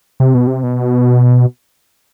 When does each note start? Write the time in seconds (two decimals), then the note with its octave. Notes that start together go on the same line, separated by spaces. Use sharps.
0.20 C3
0.34 B2
0.47 C3
0.63 B2